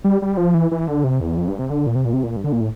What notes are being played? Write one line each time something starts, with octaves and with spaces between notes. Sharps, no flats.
G3
G3
F3
E3
E3
D3
C3
E2
F2
G2
C3
D3
A#2
C3
A#2
C3
A#2
G2
D3
A#2
A2